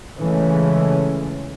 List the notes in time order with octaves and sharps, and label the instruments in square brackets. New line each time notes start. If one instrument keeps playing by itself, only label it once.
[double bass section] C#3 E3 G#3 A3 C#4